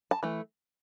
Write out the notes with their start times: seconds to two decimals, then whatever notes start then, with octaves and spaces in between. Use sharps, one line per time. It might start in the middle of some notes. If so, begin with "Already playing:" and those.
0.11 A5
0.23 E3 A3